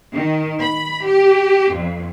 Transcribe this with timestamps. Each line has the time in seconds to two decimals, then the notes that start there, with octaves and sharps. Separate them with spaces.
0.12 D#3
0.60 B5
1.06 G4
1.74 F2